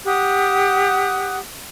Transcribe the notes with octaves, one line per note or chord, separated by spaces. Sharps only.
G4 F#5 D#6 F#6